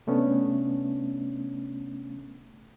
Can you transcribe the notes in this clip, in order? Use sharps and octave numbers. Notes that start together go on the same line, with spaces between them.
C3 A3 B3 C#4 D4